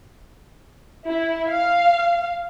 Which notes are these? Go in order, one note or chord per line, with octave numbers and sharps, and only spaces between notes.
E4
F5